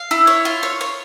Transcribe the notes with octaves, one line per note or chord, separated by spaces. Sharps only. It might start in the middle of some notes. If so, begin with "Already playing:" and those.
Already playing: F5
E4
C#5
F4
C#5
C#5